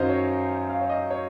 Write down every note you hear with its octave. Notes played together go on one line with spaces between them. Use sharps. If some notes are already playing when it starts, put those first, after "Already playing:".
Already playing: F#2 D#3 F#3 C5 D#5 F5
C#5
F5
C#5
D#5
C#5